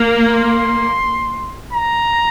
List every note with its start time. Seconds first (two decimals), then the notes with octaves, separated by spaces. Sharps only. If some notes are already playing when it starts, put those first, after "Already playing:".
Already playing: A#3
0.27 C6
1.73 A#5